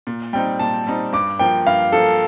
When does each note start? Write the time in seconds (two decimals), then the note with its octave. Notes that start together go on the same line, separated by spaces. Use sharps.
0.07 A#2
0.33 G3 C4 D#4 G5
0.59 A#2 A5
0.87 G3 C4 D#4
1.13 G2 D6
1.39 F3 A#3 G5
1.67 G2 F5
1.92 F3 A#3 A4